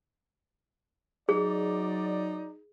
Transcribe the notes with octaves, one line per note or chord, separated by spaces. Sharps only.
F#3 D#4 G#4 D5